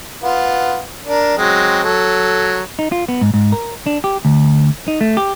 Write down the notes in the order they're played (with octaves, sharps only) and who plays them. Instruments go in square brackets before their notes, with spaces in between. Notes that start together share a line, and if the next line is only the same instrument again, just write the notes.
[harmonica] B3 F4
D4 A#4
F#3 G#3 C4
F#3 A4
[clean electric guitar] D#4
F4
B3
G#2
G#2
A#4
D4
G4
D2
D#4
A3
G4